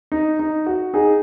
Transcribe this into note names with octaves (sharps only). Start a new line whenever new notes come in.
D#4
D#4
F#4
D#4 G#4